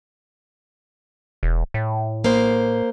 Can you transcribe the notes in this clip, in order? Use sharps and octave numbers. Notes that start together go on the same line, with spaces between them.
E1
A2
A#3 C5